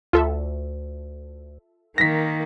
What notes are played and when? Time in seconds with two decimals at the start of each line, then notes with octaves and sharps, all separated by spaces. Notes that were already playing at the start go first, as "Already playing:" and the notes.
0.13 D2 F4 A4 E5
1.98 D#3 A#3 A#6 B6